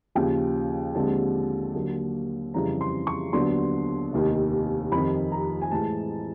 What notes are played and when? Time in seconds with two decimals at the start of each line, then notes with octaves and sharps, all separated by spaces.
0.15 D#2 C#3 F3 G5
0.94 D#2 D3 F3 G#3 C4 A5
1.74 D#2 D3 F#3 A#3
2.54 F2 C#3 E3 G3 C4 A#5
2.81 C6
3.07 C#6
3.33 D#2 D3 F#3 B3 D4 C6
4.13 F1 D#2 D#3
4.92 F2 C3 D#3 B5
5.32 A#5
5.61 G#5
5.71 A2 E3 G#3 A5